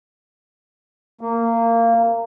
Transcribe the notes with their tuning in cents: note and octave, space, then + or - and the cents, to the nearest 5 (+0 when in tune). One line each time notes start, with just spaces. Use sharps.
A#3 -20